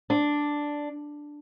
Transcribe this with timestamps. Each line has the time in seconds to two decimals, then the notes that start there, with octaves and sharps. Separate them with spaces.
0.10 D4